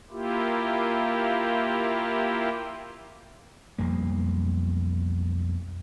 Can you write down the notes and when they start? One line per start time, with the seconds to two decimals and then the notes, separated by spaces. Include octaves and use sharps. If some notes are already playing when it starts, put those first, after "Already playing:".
0.11 A#3 E4 F4 G4
3.78 B1 F2 G3 A#3